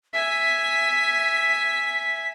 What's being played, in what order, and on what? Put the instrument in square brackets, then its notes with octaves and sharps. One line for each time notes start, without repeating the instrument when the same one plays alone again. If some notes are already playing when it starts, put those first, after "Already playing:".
[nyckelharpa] E5 G#5 [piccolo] B6